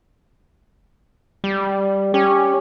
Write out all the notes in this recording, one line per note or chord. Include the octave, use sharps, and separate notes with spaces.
G3
C#4 G4